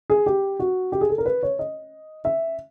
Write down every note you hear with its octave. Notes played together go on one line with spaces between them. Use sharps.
G#4
G4
F#4
G4
G#4
A4
A#4
B4
C#5
D#5
E5